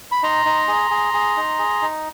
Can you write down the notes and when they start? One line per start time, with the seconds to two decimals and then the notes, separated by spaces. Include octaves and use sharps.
0.12 B5
0.23 D#4 A#5 C6
0.45 D#4
0.68 G#4
0.91 G#4
1.14 G#4
1.37 D#4
1.59 G#4
1.82 D#4